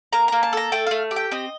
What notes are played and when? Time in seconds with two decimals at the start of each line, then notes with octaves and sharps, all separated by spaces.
0.13 A#3 A#5
0.28 A#3 A#5
0.43 A5
0.53 A4 A#5
0.72 A3 G5
0.86 A3 F5
1.11 G4
1.16 G5
1.32 C4 D#5